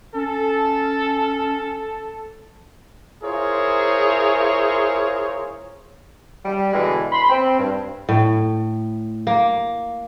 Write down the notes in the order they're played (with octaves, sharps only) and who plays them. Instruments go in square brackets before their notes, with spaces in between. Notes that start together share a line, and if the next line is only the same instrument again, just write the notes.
[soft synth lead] C#4 [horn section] A4
[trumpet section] E4 F4 G#4 A#4 C5 C#5
[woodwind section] G3
B2 D3 E3 G#3
B5 C6
C4
G2
[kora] A2
A#3